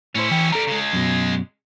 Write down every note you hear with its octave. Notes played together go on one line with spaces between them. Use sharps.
A2 C#4 E4 C5
E3 G5
G3 A4 A#4 A#5
C#3 G#3
F#2 B2